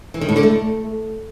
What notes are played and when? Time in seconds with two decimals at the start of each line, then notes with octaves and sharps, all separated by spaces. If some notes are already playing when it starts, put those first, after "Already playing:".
0.14 E3
0.21 D#3
0.29 A2
0.36 D3
0.43 A3